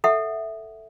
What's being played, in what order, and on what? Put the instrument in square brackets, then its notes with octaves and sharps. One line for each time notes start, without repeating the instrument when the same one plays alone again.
[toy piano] A4 E5 F#5